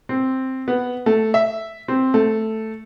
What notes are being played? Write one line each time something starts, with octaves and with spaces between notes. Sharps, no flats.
C4
B3
A3
E5
C4
A3